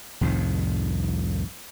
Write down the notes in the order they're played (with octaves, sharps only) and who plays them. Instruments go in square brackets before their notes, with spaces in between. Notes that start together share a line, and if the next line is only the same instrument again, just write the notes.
[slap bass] C2 F2 A2 D#3